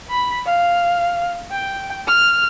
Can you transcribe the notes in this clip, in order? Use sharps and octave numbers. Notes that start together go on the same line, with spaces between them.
B5
F5
G5
F6